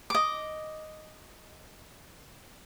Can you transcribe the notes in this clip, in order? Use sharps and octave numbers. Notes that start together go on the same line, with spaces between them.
D#5 D6